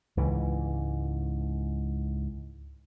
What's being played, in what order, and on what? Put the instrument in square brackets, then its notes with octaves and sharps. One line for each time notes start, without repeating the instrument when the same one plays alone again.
[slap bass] C#2 G#2 E3